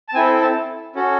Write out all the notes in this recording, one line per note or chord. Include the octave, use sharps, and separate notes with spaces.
A5
C4 E4 A4 G#5
A5
C#4 F#4 A4